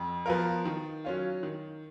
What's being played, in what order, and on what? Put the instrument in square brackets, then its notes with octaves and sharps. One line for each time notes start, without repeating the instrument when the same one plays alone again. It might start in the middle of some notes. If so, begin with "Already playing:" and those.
Already playing: [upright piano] F2
F3 B3 F4 A#4
D#3
F#3 C#4 F4
D#3